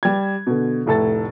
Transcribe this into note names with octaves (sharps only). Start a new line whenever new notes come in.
G3 G#6
B2 D3
F1 A2 A4 A6